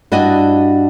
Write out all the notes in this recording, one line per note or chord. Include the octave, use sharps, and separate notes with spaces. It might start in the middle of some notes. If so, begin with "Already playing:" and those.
G2 D4 E4 F#4 D5 D#5